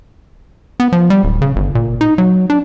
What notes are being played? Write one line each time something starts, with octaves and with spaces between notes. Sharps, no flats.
B3
F3
G3
D1
C#3
G1
A#2
D#4
F#3
D4